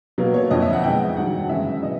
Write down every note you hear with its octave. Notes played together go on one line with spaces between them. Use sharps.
B2 F#3 A#3
C#5
F2 D3 F3 D#5
E5
F#5
B2 G#3 G5
G2 D#3 F#3 F#5
F#2 C#3 E3 G#3 E5
B2 D#5